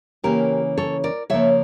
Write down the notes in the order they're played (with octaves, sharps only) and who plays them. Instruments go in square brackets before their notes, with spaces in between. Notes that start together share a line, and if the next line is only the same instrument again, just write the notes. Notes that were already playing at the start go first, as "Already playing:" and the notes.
[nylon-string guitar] C#3 E3 A#3 C#4 G4 A#4
A4 C#5
A#4 D5
C#3 F3 A#3 C#5 E5